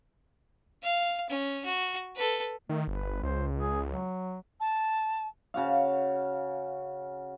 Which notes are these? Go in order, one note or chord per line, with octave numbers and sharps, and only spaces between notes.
F5
C#4
F#4
A4 B4
D#3 A3
G1 B4
C#2 C5
G#4
F#3
A5
C#3 F#4 F5